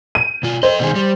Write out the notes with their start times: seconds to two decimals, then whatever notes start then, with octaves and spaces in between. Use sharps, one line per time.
0.15 D#7
0.43 B2 F4
0.63 A4 C5 D#5
0.79 B2 D#3 G#4
0.95 G3